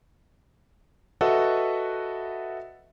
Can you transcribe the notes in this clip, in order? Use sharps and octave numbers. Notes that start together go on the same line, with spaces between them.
F#4 A4 B4 D#5 E5 F#5